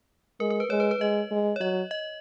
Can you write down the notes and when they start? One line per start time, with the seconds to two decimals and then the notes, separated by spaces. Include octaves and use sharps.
0.40 G#3 A#4
0.50 A#4
0.60 B4
0.70 G#3 C#5
0.80 B4
0.91 B4
1.00 G#3 D#5
1.31 G#3
1.56 C#5
1.60 F#3 D#5
1.91 D#5